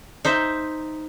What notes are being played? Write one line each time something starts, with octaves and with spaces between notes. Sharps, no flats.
D#4 C5 E5